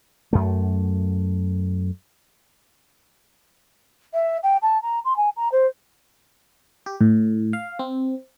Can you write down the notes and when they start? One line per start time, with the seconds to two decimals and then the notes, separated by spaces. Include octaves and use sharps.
0.33 F#2 A3
4.14 E5
4.43 G5
4.62 A5
4.82 A#5
5.05 C6
5.16 G#5
5.36 A#5
5.52 C5
6.86 G4
7.01 A2
7.53 F5
7.79 C4